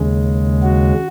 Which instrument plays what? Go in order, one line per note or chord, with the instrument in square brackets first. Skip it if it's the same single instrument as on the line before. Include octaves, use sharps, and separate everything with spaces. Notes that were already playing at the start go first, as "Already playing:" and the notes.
Already playing: [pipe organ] D#2 C#3 G#3
F#4